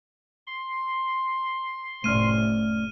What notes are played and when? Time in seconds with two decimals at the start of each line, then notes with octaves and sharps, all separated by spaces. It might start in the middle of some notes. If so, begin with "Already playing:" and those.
0.47 C6
2.04 F1 A2 A3 C#4 D5 F6 D#7